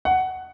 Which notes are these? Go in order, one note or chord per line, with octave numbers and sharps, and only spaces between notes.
F#5